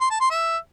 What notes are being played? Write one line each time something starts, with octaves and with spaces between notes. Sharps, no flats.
C6
A5
C6
E5